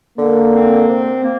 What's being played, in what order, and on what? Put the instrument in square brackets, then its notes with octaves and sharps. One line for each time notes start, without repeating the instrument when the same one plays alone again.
[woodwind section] D3 [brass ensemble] A#3
[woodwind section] C4
C3
A#3